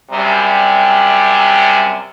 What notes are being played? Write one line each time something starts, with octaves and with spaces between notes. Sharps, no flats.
F#2 C3 G3